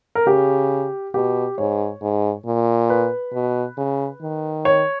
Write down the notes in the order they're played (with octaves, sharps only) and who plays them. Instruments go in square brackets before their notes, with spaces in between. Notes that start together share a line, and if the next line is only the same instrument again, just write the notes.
[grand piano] A#4
[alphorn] C#3 [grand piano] G4
[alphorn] B2 [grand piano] G4
[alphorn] G#2 [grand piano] C#5
[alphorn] G#2
A#2
[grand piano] B4
[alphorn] B2
C#3
D#3
[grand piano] C#5